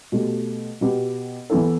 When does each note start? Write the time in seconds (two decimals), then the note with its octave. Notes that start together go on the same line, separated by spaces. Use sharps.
0.12 B2 A3 G4
0.81 B2 B3 G4
1.50 E3 B3 E4 A4